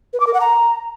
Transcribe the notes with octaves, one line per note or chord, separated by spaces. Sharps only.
B4
D6
A#4
F#5
A#5